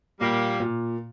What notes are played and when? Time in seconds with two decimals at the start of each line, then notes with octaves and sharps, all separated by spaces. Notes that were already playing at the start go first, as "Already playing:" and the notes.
0.21 A#2 G3 A#3
0.60 A#2